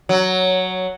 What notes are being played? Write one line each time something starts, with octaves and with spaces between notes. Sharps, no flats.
F#3